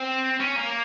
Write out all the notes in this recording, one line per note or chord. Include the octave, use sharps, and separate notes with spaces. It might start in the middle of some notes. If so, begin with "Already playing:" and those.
Already playing: C4
C#4
A#3